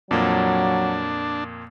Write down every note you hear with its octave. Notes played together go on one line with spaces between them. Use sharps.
F2 A#2 F#3 A#3 D4